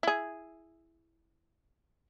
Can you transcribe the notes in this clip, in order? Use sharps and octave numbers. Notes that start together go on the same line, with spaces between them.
E4 G#4